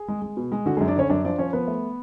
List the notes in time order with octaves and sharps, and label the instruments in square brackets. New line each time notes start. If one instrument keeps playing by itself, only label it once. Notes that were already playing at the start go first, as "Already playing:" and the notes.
Already playing: [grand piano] G#4
G#3
G#3
B2
G#3
D3 F#4
G#3 G#4
F#2
D4 D5
D3 C#4 C#5
F#2 D4 D5
F3 D4 D5
F3 C#4 C#5
F3 B3 B4
A3